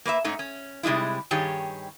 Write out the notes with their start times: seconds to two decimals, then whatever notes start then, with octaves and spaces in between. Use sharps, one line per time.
0.05 A#3 B4 D5 E5
0.24 G#2 A3 C#4 D#4
0.39 C#4
0.83 C3 G3 G#3 D#4 E4
1.31 G2 D#3 G4 G#4 C#5